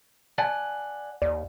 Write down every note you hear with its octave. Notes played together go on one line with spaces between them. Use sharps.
D5 F#5 G#5 A5 A6
D#2 D5